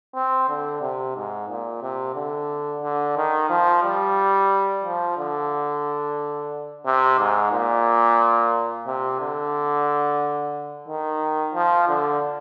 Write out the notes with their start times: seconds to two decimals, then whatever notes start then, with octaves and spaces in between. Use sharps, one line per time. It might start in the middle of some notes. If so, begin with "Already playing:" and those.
0.14 C4
0.49 D3
0.81 C3
1.16 G#2
1.49 A#2
1.82 C3
2.15 D3
2.82 D3
3.17 D#3
3.49 F3
3.83 G3
4.84 F3
5.18 D3
6.86 C3
7.19 G#2
7.52 A#2
8.87 C3
9.20 D3
10.88 D#3
11.54 F3
11.89 D3